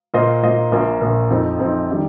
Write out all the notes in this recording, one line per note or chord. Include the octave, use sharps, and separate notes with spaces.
A#2 A#3 F4 C5 D#5
A#2 A#3 F4 C5 D#5
A#1 A#2 A#3
A#1 A#2 A#3
F2 F3 C4 D#4
F2 F3 C4 D#4
D#3 G3